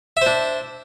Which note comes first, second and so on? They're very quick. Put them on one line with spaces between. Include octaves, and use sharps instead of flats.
E5 C5 D4